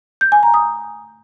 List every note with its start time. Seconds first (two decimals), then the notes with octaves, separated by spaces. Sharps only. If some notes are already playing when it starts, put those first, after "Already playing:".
0.21 G6
0.32 G#5
0.43 A#5
0.54 D#6